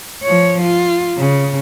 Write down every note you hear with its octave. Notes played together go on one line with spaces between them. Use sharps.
F3 C#5
F4
C#3